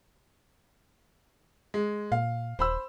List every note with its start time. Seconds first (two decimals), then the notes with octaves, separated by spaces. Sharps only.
1.74 G#3
2.12 A#2 F5
2.59 D#1 C5 B5 E6